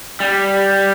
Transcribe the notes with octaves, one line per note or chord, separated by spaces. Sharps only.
G3